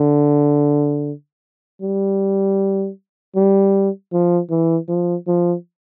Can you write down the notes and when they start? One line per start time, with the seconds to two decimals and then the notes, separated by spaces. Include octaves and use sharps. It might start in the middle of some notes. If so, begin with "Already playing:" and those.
Already playing: D3
1.82 G3
3.36 G3
4.13 F3
4.50 E3
4.89 F3
5.27 F3